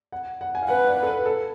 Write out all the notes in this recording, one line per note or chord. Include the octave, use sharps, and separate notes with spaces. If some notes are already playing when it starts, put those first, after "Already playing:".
F#5
F#5
G#5
F5
B4 F#5
D5
A4
B4
A4